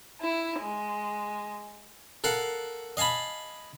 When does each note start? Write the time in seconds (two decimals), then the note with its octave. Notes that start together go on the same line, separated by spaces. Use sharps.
0.21 E4
0.60 G#3
2.24 A4 A#4 F5 F#5
2.97 D#5 F5 G#5 A5 B5